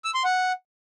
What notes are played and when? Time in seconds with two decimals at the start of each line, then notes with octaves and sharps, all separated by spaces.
0.04 E6
0.14 C6
0.24 F#5